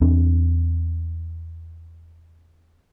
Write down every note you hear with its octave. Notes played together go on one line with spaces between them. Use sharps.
E2 C4 D4